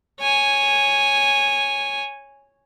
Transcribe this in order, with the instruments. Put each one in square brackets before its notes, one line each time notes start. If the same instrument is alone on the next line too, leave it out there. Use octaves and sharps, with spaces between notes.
[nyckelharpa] C#5 G#5